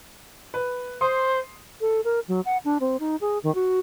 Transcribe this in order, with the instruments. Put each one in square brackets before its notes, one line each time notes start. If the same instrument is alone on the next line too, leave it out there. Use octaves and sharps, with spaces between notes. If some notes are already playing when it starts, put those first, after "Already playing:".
[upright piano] B4
[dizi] C5 [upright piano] C6 D#6
[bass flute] A4
A#4
F#3
F#5
D4
C4
D#4
G#4
D#3
F#4